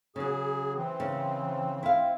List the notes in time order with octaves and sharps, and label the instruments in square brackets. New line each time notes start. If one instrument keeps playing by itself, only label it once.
[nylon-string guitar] C#3 F#3 [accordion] G#4
[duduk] E3 [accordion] C4
[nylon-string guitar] C#3
E4 F5